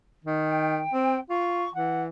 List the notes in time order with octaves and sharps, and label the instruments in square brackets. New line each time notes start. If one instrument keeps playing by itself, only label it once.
[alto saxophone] D#3
[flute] G5
[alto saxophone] C4
[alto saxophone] F4 [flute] C#6
[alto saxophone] E3 [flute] F#5